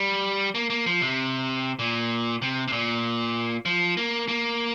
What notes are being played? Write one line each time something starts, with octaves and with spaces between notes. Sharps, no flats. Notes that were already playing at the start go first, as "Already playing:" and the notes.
Already playing: G3
A#3
A#3
F3
C3
A#2
C3
C3
A#2
F3
A#3
A#3